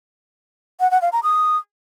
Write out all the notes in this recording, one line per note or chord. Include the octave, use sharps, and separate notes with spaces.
F#5
F#5
F5
A#5
D#6